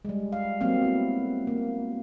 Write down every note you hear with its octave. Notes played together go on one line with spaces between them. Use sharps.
G3 G#3
F5
F#3 A#3 C4 F5
B3 E4
A#3